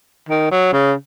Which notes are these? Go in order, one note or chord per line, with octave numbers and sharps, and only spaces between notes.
D#3
F#3
C#3